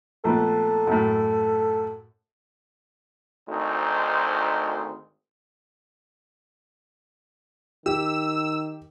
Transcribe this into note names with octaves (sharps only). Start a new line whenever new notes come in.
A#1 A3 B3 A4
F#2 A2
G#1 D2 D#4 C5
D#3 G4 E6